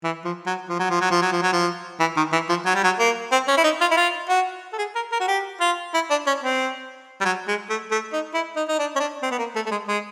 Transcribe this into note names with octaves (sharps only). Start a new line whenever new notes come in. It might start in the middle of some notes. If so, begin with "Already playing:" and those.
E3
F3
F#3
F3
F#3
F3
F#3
F3
F#3
F3
F#3
F3
E3
D#3
E3
F3
F#3
G3
F#3
A#3
C4
C#4
E4
D#4
F4
E4
F4
F#4
A4
G#4
A#4
A#4
F#4
G4
F4
E4
D4
C#4
C4
G3
F#3
G#3
A3
A3
D#4
E4
D#4
D#4
D4
C#4
D4
C4
B3
A#3
A3
A3
G#3
G#3